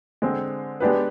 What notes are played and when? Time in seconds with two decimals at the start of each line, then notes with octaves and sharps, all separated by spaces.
0.22 D3 G#3 C4
0.80 G#3 B3 D4 G4 B4